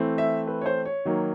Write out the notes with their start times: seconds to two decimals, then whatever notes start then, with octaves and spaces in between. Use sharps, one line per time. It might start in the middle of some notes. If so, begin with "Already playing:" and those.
Already playing: E3 A3 C4
0.18 E5
0.47 B4
0.61 C#5
0.66 C5
0.85 C#5
1.05 D#3 F#3 A#3